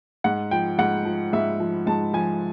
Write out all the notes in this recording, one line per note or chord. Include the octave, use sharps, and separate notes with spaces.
G#2 F#5
F3 G5
G#2 F#5
F3
G#2 E5
F3
G#2 A5
F3 G#5